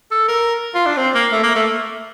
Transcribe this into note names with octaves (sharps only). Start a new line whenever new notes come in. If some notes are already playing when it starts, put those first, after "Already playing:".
A4
A#4
F4
D4
C4
A#3
A3
A#3
A3